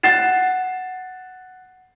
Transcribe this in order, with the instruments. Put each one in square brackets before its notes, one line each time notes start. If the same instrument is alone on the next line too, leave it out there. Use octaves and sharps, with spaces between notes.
[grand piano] F#5 A6 C7 E7